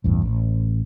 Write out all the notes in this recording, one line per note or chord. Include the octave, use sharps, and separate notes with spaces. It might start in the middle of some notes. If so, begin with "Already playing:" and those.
A1 E2 G2
A1